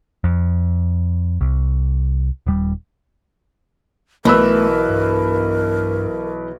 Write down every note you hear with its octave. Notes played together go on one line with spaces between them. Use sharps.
F2
C2
D#1 G3
B1 E3 A3 A#4 B4 E6
G2